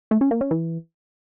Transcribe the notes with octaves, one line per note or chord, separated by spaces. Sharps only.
A3
C#4
A#3
C#4
E3